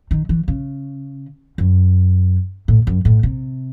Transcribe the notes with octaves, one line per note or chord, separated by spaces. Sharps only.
D#3
E3
C#3
F#2
A2
F#2
A2
C3